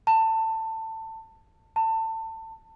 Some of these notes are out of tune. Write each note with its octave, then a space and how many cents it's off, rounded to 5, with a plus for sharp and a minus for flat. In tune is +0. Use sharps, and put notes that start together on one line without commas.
A5 +20
A5 +25